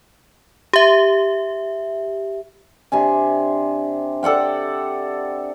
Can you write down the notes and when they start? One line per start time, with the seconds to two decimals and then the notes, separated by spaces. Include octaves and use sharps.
0.73 G4 E5
2.92 C3 D4 G#5
4.23 A4 D5 F#5 G5